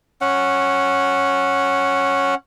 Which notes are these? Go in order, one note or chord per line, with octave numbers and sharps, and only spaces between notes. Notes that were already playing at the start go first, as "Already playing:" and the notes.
C#4 F#5